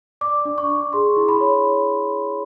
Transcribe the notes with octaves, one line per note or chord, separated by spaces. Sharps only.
D5 D6
D4
C#6
D4
G#4 C6
E4
B5
C#5